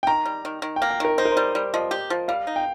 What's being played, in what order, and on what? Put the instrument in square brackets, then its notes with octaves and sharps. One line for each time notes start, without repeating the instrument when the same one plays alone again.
[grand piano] G5
[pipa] D#3 [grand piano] A#5
[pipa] G3
D#3
D#3
[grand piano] G5
[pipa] A#3
[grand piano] G5
[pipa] D#3 [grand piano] A#4
[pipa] D#4 [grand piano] C5
[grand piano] A#4
[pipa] G3 [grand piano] C5
[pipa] G3
[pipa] F3 [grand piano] D#5
[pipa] G4
F3
[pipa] G3 [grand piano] F5
[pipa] D#4
[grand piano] G5